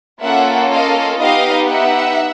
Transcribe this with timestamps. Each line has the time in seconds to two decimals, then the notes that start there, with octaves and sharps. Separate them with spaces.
0.22 A#3 C#4 F4 A4 E5 F#5
0.71 D#5 F5
1.19 B3 D#4 G4 D#5 F5
1.68 E5 F#5